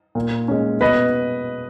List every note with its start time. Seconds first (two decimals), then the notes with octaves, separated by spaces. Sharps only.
0.15 A#2
0.48 G#3 C#4
0.81 B2 B4 D#5